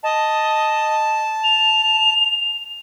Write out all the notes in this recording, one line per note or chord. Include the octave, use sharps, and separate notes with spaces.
D#5 A5
F7